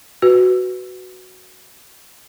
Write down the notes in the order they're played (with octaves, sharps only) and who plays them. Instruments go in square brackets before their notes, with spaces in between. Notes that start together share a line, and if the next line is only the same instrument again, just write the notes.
[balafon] F#4 B4